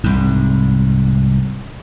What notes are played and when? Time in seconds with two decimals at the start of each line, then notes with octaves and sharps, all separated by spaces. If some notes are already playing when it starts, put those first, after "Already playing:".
0.04 C2 G#2